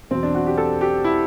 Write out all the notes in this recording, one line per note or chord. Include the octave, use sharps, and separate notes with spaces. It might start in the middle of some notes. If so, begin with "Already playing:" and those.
E2 B2 F#3 C4
D4
F#4
G4
A4
G4
E4